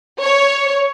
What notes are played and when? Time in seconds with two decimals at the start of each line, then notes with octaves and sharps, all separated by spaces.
0.21 C#5